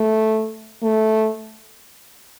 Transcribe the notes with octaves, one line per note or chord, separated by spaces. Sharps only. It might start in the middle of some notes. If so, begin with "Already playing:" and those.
Already playing: A3
A3